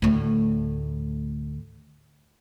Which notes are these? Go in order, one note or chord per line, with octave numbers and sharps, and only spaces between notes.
D2 A2